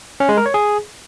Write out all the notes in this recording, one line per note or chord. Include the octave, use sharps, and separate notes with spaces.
C#4
G#3
A#4
C#5
G#4